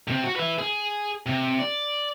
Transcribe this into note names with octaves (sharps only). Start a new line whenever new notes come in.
C3 C4
F#4
B4 E5
G#4
C3
D5